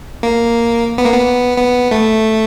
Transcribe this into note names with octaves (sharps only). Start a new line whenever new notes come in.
A#3
B3
A#3
B3
B3
A3